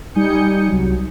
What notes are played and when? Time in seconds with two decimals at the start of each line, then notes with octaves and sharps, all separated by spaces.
0.15 G3 D#4 G#5 D#6 G6 C#7
0.68 C2 F#3